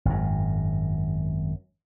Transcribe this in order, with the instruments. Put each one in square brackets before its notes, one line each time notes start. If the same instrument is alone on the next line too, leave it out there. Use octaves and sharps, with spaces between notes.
[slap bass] G#1 F#2